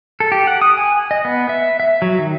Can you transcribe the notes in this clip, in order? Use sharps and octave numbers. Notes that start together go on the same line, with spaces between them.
A4
G4
F#5
D#6
G#5
D#5
B3
E5
E5
F#3
D#3